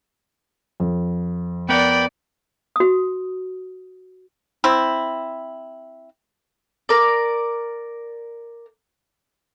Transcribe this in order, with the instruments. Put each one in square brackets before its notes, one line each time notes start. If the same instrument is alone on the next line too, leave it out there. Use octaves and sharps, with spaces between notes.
[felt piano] F2
[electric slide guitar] B3 A#4 [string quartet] D5 [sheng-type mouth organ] G5 B5
[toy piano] F#4 D#6
[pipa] C4 E4
[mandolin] A#4 D5